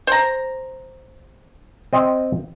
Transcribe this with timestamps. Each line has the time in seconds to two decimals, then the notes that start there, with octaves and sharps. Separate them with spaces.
0.07 C5 A#5
1.93 C4 D#5